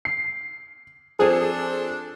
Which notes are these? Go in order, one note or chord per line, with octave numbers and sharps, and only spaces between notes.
C7
F3 C4 D4 G#4 A4 C5